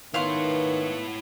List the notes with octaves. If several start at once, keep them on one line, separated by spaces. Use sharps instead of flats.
D#3 B3 E4 C#5 F5 F#5 C6